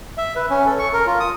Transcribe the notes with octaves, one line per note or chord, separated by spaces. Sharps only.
E5
B4
C#4
A4
C#6
A#4
F4
D#6